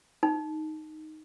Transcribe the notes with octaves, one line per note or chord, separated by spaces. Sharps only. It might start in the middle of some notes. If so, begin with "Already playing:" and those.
D#4